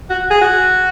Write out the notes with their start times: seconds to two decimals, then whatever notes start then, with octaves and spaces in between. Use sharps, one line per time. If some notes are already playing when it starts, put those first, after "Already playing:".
0.10 F#4
0.31 G#4
0.41 F#4